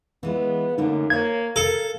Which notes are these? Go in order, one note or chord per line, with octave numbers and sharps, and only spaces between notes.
E3 G#3 B3 F4
F#2 D3 A3 A#3 D#4
A#3 C#5 F5 G#6
A4 A#4 F5